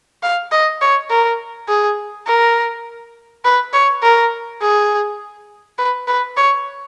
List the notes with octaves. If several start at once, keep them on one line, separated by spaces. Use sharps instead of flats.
F5
D#5
C#5
A#4
G#4
A#4
B4
C#5
A#4
G#4
B4
B4
C#5